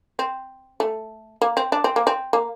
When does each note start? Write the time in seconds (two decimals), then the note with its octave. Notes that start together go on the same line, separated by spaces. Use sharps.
0.19 C4
0.80 A3
1.42 A#3
1.57 C4
1.72 D4
1.84 C4
1.96 A#3
2.07 C4
2.33 A#3